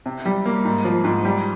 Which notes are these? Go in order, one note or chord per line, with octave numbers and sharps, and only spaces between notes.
C3
G3
A#3
G#2
F3
G#2
G3